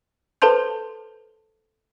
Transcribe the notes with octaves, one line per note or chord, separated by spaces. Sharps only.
A4 B4 C5 A5 C6 G6